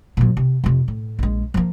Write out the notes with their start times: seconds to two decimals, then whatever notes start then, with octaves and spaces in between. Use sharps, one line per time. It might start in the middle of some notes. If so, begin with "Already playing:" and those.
0.17 A#2 F#3
0.37 C3
0.64 F2 C3
0.88 A2
1.19 A#1 G#3
1.54 F3 A#3